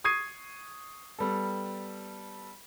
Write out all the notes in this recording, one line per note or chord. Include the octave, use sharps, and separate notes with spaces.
C#6 D#6 G#6 C7 D#7
G3 B3 A4